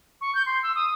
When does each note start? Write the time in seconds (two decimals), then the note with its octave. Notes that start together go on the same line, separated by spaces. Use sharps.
0.21 C#6
0.35 G6
0.46 C6
0.63 E6
0.75 D#6